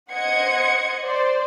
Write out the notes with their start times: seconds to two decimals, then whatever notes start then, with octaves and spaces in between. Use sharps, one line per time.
0.10 C5 D#5 F#5 G#6 C#7
1.00 C5 D5